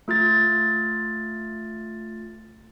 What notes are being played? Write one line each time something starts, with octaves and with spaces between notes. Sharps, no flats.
A3 F4 F6 A6